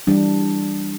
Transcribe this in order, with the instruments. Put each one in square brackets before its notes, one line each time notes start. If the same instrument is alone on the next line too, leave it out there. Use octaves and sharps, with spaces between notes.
[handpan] E3 G3 D4